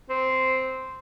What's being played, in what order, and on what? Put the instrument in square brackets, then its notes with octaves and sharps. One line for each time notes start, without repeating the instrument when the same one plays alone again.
[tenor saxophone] C4